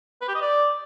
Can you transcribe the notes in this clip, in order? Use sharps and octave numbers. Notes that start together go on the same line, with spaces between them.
B4
G4
D#5
D5